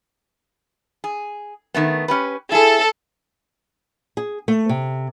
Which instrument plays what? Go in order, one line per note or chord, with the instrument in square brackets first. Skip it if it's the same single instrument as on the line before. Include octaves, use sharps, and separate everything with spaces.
[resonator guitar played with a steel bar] G#4
D#3 A3 B3
C#4 G4 B4
[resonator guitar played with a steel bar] E4 G#4 [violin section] A4
[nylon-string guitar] G#4
A3
C3